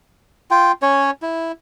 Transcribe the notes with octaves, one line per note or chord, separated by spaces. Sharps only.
F4 G5
C#4 C#5
E4